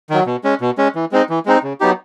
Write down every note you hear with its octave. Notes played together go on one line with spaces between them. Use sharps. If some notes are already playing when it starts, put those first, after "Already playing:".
D#3 F#3
B2
G#3 C#4
B2
G#3 C#4
E3
G#3 C4 D#4
E3
G#3 C4 D#4
C#3
F#3 B3 D#4 G4